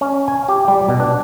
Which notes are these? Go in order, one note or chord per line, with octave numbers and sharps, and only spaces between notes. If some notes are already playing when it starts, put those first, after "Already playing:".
C#4
G#5
G4
G3
B2
D4